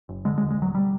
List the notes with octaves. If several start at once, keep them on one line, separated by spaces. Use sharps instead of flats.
F#1
D3 G#3
G#3
E1
G#3
E1 F#3
G3